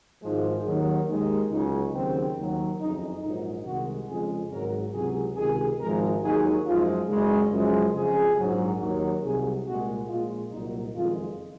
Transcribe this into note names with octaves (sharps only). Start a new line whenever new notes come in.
G#1 G#2 F3 G#3
D#2 D#3 F#3
D#2 D#3 G#3
C#2 C#3 F#3 D#4
D#2 C#3 F#3 C4
D#2 D#3 F#3
F#1 F2 C#3 D#4
A#1 G#2 F#3 D#4
C2 C3 D#3 G#3 F#4
F2 C#3 G#3 G#4
G#1 G#2 D#3 F#3 A#4
C#2 C3 F#3 G#4
C#2 C3 D#3 G#4
G#1 G#2 F3 G#3 A#4
D#2 D#3 F#3 G#4
F#2 F3 G#3 F4
F#1 F#2 C#3 G#3
F#2 C#3 F3 G#3
F2 C#3 F3 G#3 G#4
A#1 G#2 F#3
D#2 D#3 F#3
C2 C3 F#3 G#4
C2 A#2 G#3 F#4
A#1 A#2 G#3 F4
C2 A#2 F#3 D#4
F#1 F2 D#3 G#3 F4